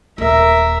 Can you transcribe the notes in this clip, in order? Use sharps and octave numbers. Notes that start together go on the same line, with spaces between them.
D#1 D#2 A#4 E5